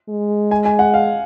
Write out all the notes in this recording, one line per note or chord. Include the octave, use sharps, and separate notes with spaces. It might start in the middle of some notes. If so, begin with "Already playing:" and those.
G#3
G#5
G#5
F#5
F5